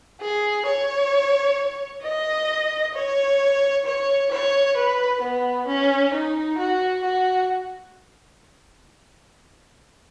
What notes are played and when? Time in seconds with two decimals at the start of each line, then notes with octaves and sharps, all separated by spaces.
0.21 G#4
0.66 C#5
2.04 D#5
2.94 C#5
3.86 C#5
4.31 C#5
4.76 B4
5.22 B3
5.67 C#4
6.13 D#4
6.58 F#4
7.04 F#4